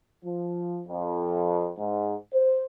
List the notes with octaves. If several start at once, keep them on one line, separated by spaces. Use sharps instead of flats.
F3
F2
G#2
C5